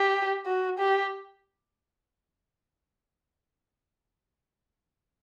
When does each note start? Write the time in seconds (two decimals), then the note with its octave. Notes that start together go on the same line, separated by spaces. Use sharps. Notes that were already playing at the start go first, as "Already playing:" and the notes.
Already playing: G4
0.46 F#4
0.79 G4